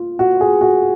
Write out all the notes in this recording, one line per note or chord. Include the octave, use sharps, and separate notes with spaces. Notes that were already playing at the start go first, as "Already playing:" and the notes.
Already playing: F4
F#4
G#4
F#4